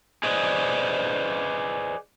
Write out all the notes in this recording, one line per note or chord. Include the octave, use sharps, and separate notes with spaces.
G#4 B4 C5 D5 D#5